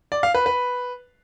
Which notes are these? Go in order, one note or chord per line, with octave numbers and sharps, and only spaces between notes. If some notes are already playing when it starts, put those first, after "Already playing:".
D5
F5
B4
B4